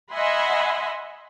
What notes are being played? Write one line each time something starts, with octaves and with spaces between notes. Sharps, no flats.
D#5 E5 F#5 G#5 B5 C6